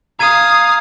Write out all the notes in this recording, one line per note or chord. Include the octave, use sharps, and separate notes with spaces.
F5 A#5 D#6 G#6 D#7